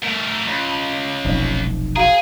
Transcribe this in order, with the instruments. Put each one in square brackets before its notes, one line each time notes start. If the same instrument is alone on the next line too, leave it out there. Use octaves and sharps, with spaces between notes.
[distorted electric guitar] A3 A#4
C#2
[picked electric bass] F1 B1
[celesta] F#4 F5 A#5 [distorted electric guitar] G#4